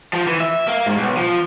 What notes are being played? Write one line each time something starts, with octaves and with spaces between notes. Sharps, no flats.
F3
E3
E5
A#3
G#2
B1
F3